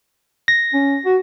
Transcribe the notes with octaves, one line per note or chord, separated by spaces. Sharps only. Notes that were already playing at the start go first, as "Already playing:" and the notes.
A#6
C#4
F#4